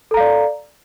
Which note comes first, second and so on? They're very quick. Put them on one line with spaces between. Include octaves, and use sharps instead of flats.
A4 A#5 F5 D5